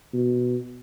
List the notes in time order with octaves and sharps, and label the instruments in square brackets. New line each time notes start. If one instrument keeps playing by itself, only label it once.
[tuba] B2